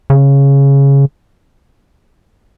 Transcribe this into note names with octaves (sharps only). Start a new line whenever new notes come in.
C#3